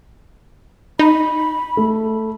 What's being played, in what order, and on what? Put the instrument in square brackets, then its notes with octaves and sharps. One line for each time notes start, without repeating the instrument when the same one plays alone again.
[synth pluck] D#4 [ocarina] B5
[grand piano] A3